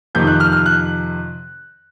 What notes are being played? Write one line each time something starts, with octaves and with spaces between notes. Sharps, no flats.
F2 C3 D#3 G6
F#6
F6
F6
F#6